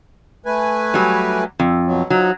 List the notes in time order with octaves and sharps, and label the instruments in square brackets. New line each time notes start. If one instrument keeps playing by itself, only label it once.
[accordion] A3 B4 G#5
[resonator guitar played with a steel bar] F#3 G3
F2
[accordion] B2 F#3
[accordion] F3 D#4 [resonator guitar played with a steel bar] F#3